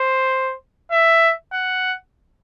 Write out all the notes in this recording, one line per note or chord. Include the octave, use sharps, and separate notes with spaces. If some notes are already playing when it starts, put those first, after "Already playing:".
Already playing: C5
E5
F#5